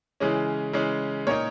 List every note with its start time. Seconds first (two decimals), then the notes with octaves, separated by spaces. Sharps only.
0.20 C#3 E3 G#3 C#4
0.73 C#3 E3 G#3 C#4
1.27 A#2 A#3 D#4 A#4 C#5